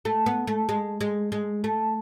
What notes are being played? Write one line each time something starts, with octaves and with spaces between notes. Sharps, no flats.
A3
B3
A3
G#3
G#3
G#3
A3